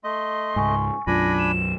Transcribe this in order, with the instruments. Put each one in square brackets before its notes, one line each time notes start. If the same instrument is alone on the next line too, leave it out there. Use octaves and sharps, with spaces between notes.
[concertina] A3 D#5 [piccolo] C6
[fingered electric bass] C#2 G#2 [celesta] G#5 C#6
[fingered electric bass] B1 F#2 [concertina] D4 G#5 B5 [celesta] F4 [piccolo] A#6
[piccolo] E7